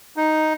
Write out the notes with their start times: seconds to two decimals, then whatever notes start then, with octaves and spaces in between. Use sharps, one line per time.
0.16 D#4